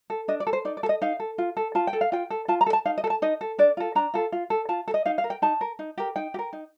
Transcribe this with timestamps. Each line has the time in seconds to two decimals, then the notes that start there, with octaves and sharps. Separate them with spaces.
0.10 A4
0.28 D4 D#5
0.40 D5
0.47 A4
0.53 C5
0.65 D#4 D5
0.77 D5
0.83 A4
0.89 D#5
1.02 D#4 F5
1.20 A4
1.38 F4
1.57 A4
1.75 F4 A5
1.87 G5
1.93 A4
2.01 F5
2.12 F4 G5
2.30 A4
2.48 F4 A5
2.61 A#5
2.66 A4
2.73 A5
2.85 D#4 F5
2.98 D#5
3.04 A4
3.10 A5
3.22 D#4 D#5
3.41 A4
3.58 D4 D5
3.77 F4 A4
3.95 D4 A#5
4.14 F4 A4
4.32 F4
4.50 A4
4.69 F4 A5
4.88 A4
4.94 D#5
5.06 D#4 F5
5.18 F5
5.24 A#4
5.30 G5
5.42 D#4 A5
5.61 A#4
5.79 D#4
5.98 G4 A#4
6.16 D#4 G5
6.34 G4
6.39 A#4
6.53 D#4